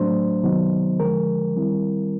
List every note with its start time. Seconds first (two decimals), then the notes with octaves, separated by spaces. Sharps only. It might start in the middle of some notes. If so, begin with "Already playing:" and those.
Already playing: A2 F#3 A3 D4 C5
0.43 C3 D#3 F#3 B3 D#4
1.00 D3 F3 G#3 A#4
1.56 D#3 G3 C4 E4